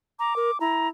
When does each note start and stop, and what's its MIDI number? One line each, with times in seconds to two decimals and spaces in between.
0.19 0.36 82
0.19 0.58 86
0.36 0.51 70
0.60 0.89 64
0.60 0.88 82